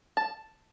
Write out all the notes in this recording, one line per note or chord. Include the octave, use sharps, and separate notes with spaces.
A5